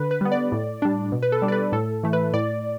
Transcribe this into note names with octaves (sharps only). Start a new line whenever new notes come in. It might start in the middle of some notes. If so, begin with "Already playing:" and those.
Already playing: D3 B4
B4
G3 B3
D5
A2
G3 D4
B2
B4
A4
G3 D4
D5
B4
A2 A4
E3 A3
B4
A2 D5